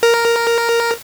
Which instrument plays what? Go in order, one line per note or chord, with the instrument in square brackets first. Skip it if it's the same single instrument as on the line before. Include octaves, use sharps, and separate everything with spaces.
[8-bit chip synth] A#4